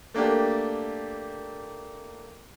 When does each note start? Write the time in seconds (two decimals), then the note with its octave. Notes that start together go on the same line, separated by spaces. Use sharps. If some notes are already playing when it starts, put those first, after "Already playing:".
0.14 A3 A#3 D4 G4